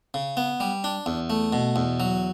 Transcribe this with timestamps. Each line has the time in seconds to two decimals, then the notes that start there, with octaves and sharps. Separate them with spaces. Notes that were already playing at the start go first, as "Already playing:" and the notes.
0.14 C#3
0.37 B3
0.60 G3
0.84 D4
1.06 E2
1.30 A3
1.53 B2
1.76 E2
2.00 F#3